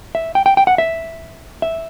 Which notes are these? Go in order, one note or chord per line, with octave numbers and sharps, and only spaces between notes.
E5
G5
G5
G5
F#5
E5
E5